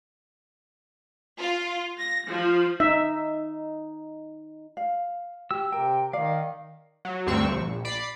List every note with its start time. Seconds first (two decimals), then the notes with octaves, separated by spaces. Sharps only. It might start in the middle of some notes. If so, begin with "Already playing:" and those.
1.39 F4
1.99 A#6
2.29 F3
2.80 D#4 E5
4.77 F5
5.51 G4 E6
5.72 C3 A#4 G5
6.13 D#3 D5 F5
7.05 F#3
7.27 D2 G2 C4 C#6 E6
7.51 A#1
7.85 D5 B5 C7